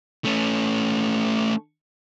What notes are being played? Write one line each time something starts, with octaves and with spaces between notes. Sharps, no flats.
A3 C#4